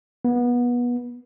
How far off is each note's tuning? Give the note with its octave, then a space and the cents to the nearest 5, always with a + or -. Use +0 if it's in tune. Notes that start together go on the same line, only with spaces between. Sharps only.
B3 -25